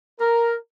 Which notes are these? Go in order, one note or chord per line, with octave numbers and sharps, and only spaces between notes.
A#4